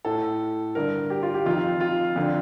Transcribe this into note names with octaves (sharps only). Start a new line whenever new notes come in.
A2 A4
G2 D3 A#4
G4
F4
G4
F2 D#3 F4
F4
F2 D3